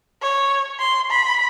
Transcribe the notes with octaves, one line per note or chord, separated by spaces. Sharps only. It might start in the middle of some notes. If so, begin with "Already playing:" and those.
C#5
C6
B5